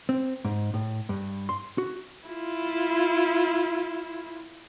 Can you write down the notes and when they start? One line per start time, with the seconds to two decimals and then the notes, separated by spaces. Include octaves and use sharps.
0.09 C4
0.45 G#2
0.74 A2
1.09 G2
1.49 C6
1.78 F#4
2.28 E4 F4